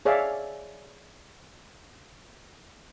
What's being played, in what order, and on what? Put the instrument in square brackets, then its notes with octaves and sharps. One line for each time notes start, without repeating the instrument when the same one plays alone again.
[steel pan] G#4 C#5 D5 E5 F5